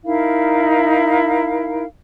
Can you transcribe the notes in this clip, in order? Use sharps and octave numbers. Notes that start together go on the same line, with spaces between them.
D#4 E4 A#4 F5